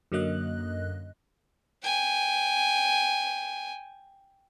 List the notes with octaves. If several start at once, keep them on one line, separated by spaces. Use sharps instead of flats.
F#2 D3 F#3 A#3 D#5 F#6
G5 G#5